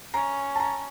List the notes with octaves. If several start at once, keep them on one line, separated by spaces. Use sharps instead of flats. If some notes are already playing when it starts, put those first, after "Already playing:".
C#4 A#5
A5 A#5